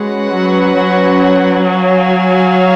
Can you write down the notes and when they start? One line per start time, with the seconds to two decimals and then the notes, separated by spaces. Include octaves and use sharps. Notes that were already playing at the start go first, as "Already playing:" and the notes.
Already playing: G#3 C#4 F#4 B4 F#5
0.34 F#3
0.78 F#3
1.66 F#4 C#5 F5 G#5